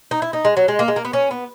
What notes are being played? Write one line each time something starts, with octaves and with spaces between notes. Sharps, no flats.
D#4
E4
D#4
G#3
F#3
G#3
A#3
G#3
A#3
B3
C#4
B3